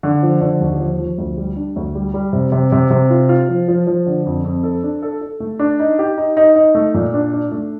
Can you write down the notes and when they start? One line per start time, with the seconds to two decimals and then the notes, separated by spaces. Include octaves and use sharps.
0.03 D3
0.23 F3
0.41 D3
0.60 D#2
0.80 F3
0.99 F3
1.18 D2
1.37 G3
1.56 D4
1.76 D2
1.95 G3
2.14 G3
2.33 C3
2.52 C3
2.72 C3
2.91 C3
3.10 F4
3.29 F4
3.49 F3
3.68 F3
3.87 F3
4.06 D3
4.26 F2
4.45 F2
4.63 A4
4.83 D4
5.03 A4
5.21 A4
5.40 A3
5.59 D4
5.79 D#4
5.99 G4
6.17 D#4
6.37 D#4
6.56 D#4
6.75 A3
6.94 A#2
7.14 D4
7.33 D4
7.52 A3